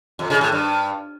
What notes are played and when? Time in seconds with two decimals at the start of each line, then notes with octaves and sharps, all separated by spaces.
0.19 F2
0.30 C#3
0.41 A2
0.52 G2